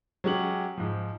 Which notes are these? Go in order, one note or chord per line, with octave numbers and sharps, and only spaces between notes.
F#3 G#3 C#4 G4 F#5 F#7
G#2 F3